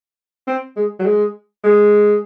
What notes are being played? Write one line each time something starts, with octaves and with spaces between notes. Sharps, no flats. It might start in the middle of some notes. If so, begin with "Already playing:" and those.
C4
G#3
F#3
G#3
G#3